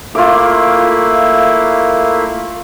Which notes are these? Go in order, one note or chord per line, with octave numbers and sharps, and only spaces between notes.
A3 A#3 E4 F4 D6